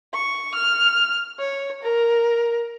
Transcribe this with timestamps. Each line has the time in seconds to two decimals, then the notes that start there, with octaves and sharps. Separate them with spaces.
0.14 C#6
0.55 F6
1.40 C#5
1.82 A#4